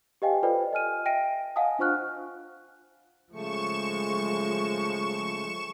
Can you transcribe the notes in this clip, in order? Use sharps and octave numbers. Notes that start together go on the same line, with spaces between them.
G4 B4 D#5 F5 G5 G#5
F4 A4 B4 C5 D5 G5
D#5 G#5 F6 D#7
D#5 E5 G5 A#6 D7 D#7
D#5 F5 F#5 G#5 A5 D#6
D4 F4 C5 C#6 F6 F#6
C#3 F3 G#3 A3 C#6 E7